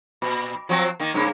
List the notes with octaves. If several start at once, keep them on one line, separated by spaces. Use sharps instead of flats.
A#2
F3 F#3 C4
D#3 A#3
G2 C#3 A#3